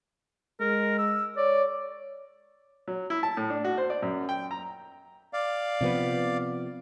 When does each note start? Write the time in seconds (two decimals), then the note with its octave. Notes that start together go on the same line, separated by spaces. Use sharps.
0.60 G#3 A#4
0.98 E6
1.37 C#5 D5
2.88 F#3
3.10 E4
3.23 A5
3.37 A2
3.50 D4
3.65 F#4
3.78 C5
3.90 D5
4.02 F#2
4.29 G5
4.51 A#5
5.33 D5 F5
5.81 C3 F3 B3